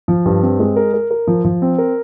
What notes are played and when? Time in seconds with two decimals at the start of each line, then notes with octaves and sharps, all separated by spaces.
0.08 F3
0.26 G2
0.42 C4
0.60 G#3
0.76 A#4
0.94 A#4
1.11 A#4
1.27 F3
1.44 F3
1.62 C4
1.78 A#4